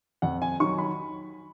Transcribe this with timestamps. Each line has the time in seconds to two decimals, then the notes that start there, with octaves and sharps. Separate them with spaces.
0.22 F2 F#5
0.42 G#5
0.60 D#3 F#3 C#6
0.78 B5